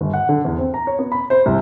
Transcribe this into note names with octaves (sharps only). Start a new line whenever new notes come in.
G1
F#5
D3
E2
C4
A#5
C#5
B3
B5
C5
C2